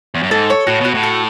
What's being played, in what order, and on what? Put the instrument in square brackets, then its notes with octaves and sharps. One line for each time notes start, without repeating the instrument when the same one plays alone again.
[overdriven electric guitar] E2
F#2
[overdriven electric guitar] G#2 [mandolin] A4
[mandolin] C#5
[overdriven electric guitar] A2 [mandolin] F#4
[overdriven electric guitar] B2 [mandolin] F#4
[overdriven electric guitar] A2
[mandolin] A4